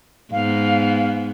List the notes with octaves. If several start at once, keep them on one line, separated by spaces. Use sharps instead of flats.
G#2 B3 F5